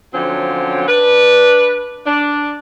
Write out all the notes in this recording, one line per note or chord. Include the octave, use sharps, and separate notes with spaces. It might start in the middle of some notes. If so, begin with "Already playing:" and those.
D3 F3 F#3 C4 C#4
D4 B4
D4